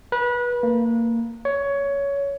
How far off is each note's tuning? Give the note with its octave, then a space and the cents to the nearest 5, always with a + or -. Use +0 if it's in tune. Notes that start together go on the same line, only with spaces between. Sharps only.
B4 -30
A#3 -20
C#5 +15